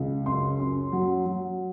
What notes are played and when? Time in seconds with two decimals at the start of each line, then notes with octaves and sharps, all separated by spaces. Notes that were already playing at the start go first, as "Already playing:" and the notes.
Already playing: C#2
0.26 F#2 C6
0.60 F#2
0.92 F#3
1.26 F#3